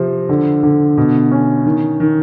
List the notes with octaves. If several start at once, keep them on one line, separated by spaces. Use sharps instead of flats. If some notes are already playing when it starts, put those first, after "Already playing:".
Already playing: C3 F3
D3
D3
B2
C#4
D#3
D#3